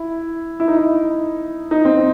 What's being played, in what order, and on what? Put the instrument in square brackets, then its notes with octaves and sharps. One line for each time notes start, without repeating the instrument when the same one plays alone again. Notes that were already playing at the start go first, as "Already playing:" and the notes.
Already playing: [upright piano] E4
E4
D#4
E4
D#4
C4